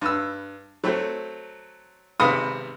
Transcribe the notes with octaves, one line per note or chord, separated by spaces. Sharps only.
G2 E6
F#3 A3 C4
G#1 C3 B3 F5 C6 D#6